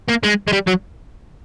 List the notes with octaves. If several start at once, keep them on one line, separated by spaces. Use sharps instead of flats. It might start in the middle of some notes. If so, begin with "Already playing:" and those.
A#3
G#3
G#3
G3
F#3